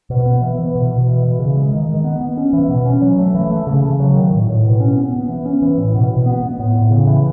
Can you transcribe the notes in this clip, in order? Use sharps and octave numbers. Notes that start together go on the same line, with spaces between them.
B2
B3
E3
E3
B2
B2
E3
E3
C#3
G#3
D#3
D#3
B3
B3
C#4
E3
B2
C#4
F#3
A3
E3
A3
C#3
C#3
F#3
D#3
A2
A2
B2
C#4
B3
B3
E3
C#4
E3
A2
B2
B2
B3
B3
A2
A2
C#3
E3